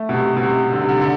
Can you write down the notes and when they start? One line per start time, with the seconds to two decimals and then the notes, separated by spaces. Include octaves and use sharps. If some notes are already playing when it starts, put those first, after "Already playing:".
Already playing: A3
0.09 B2
0.13 C3
0.36 B2
0.43 C3
0.73 D3
0.81 C3
0.89 D3
1.01 D3